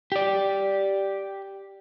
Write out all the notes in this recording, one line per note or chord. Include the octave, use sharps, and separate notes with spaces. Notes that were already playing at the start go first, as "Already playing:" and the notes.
G4 D5